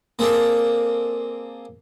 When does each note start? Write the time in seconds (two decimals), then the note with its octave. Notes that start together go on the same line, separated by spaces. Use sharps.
0.19 A#3 C4 G#4 A4 D5